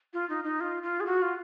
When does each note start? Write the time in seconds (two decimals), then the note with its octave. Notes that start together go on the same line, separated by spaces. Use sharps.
0.13 F4
0.29 D#4
0.44 D#4
0.60 F4
0.83 F4
1.00 G#4
1.06 F#4
1.22 F4